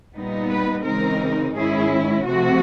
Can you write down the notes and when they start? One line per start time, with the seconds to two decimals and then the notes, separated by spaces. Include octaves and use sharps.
0.16 A#2 G3 B3 D#4
0.51 B4
0.86 C#3 E3 G#3 C4 D#4 A#4
1.56 G#2 D#3 G#3 C#4 E4 G#4
2.26 C3 F3 A3 C4 F#4